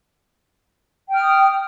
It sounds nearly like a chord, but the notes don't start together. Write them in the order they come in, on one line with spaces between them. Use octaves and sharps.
G5 F6 D#6